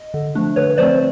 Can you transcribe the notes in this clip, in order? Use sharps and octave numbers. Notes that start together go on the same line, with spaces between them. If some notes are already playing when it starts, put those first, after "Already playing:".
Already playing: D#5
D3
F3 A3 D4
D3 B4 C#5
F3 A3 C4 C5 D5